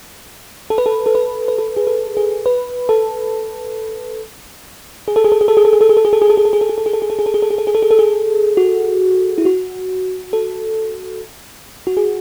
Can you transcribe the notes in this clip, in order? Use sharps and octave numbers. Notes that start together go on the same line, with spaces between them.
A4
B4
A4
A4
B4
B4
A4
G#4
A4
G#4
B4
A4
G#4
A4
G#4
A4
G#4
A4
G#4
A4
G#4
A4
G#4
A4
G#4
A4
G#4
A4
G#4
A4
G#4
A4
G#4
A4
G#4
A4
G#4
A4
G#4
A4
G#4
A4
G#4
A4
G#4
A4
G#4
A4
G#4
F#4
E4
F#4
A4
F#4
G#4